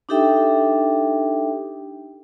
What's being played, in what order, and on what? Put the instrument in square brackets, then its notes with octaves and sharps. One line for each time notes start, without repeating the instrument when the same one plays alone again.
[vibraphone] D4 D#4 G4 A4 E5 G5